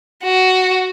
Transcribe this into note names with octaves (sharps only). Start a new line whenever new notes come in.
F#4